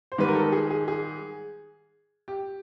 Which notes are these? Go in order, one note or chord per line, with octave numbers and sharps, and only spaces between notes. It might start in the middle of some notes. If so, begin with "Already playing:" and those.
C5
G#2 D#3 G3 B4
A#4
A4
G#4
G#4
G#4
G4